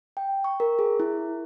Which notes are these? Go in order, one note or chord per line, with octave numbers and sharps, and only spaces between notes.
G5
C#6
A#4
G#4
E4